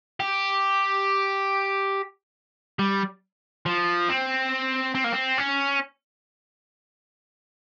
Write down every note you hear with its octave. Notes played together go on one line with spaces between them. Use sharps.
G4
G3
F3
C4
C4
A#3
C4
C#4